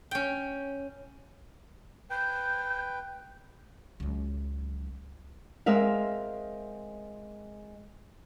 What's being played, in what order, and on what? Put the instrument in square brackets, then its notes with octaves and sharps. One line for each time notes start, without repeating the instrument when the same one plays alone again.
[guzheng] C#4 G5
[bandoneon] B4 G5 [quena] G6
[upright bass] C#2 F#3
[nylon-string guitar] G#3 C4 A#4 E5 F5